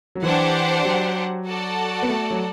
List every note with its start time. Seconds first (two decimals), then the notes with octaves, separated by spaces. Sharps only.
0.15 F#3
0.23 E3 D4 G4 C5 F#5
0.84 F#3
1.46 F#4 A4 D5 F#5 A5
2.03 B3
2.09 A3
2.31 F#3